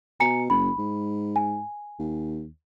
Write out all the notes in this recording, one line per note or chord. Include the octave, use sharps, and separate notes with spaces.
B2 G#5 A#5 C#7
F#1 B5
G#2
G#5
D#2